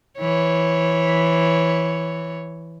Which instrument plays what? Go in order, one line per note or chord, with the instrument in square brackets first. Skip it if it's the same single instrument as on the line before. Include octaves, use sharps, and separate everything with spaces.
[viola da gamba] E3 C#5